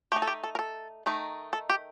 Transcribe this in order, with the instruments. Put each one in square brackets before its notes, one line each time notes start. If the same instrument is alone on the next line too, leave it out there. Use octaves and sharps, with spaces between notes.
[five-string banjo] A3 D#4 G4
A4
G4
A4
A#4
A4
D#3 A3 D#4
A4
G4